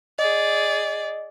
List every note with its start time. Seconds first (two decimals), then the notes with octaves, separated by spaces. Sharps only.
0.19 G#4 D5 D#5